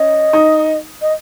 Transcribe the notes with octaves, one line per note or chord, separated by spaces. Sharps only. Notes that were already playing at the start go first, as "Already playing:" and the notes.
Already playing: C#4 D#5
D#4
D#5